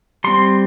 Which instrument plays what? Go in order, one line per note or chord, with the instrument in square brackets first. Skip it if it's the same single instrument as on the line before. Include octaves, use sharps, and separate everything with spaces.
[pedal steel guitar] G3 C4 C6